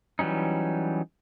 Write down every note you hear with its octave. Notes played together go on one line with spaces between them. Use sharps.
E3 F#3 G3 C#4 D#4